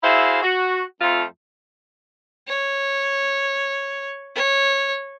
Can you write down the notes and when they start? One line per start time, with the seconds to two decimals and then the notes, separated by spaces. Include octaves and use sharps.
0.03 E4 F#4 G#4 C5 E5 F5
0.43 F#4
1.01 F2 F3 A3 F4
2.48 C#5
4.35 C#5